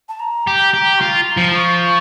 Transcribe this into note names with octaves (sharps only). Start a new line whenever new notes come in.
A5
A#5
G4
G4
C#6
F4 A#5
A#5
F3
A#5
C#6